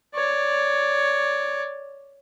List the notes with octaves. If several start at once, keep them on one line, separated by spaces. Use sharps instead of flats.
C#5 D5